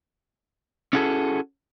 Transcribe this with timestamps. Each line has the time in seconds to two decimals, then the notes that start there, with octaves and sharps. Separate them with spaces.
0.93 C#4 E4 F#4 G#4 A4